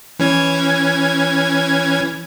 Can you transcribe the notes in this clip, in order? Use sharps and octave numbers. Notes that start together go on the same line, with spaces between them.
E3 C#4 G#6